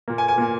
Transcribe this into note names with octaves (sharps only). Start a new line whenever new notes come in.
A#2 A#3
G#5
G#5
A#2 A#3